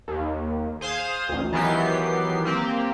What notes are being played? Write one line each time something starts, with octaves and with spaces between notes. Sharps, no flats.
D#2
G#4 C5 F5 D#6
A1 D2
D#3 E3 F#3 B3 G4 C7
A#3 C4 G4